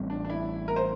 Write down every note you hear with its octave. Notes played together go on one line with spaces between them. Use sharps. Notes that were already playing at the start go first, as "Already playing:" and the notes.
Already playing: A1 A2 G3 C4
D4
D4
E4
A#4
C5